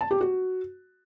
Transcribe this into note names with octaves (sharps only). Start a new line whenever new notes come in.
A5
G4
F#4